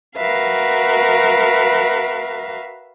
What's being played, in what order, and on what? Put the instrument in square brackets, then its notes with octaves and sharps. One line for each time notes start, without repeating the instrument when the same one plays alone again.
[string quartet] F#4 A#4 B4 E5 F5